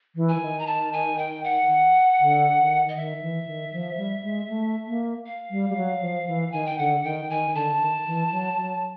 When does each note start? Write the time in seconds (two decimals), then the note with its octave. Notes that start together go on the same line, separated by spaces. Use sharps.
0.16 E3
0.28 G#5
0.36 E3
0.41 D#3
0.59 A#5
0.66 A5
0.93 G#5
1.17 G5
1.43 F#5
2.20 D3
2.57 D#3
2.88 D#5
2.96 D#3 E5
3.22 E3
3.47 D#3
3.73 F3
3.97 G3
4.23 G#3
4.49 A3
4.87 A#3
5.26 F5
5.51 G3
5.70 G3
5.76 F#3
6.01 F3
6.27 E3
6.51 D#3 G#5
6.65 G5
6.78 D3 F#5
7.03 D#3 G5
7.29 D#3 G#5
7.54 D3 A5
7.80 D#3
8.06 E3
8.32 F#3
8.56 F#3